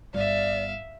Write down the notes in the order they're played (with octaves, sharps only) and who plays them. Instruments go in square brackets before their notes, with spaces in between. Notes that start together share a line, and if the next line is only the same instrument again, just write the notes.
[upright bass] G1 [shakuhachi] D5 [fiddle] E5 F5